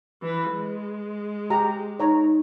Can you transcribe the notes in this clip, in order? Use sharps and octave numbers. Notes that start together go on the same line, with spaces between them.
E3 B4
G#3
G4 G#4 A#5
D#4 C#5 A#5